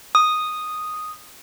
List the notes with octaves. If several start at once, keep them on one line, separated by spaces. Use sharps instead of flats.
D#6